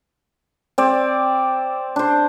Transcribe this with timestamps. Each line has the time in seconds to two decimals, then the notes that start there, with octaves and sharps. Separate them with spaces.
0.78 C4 D5
1.96 D4 C5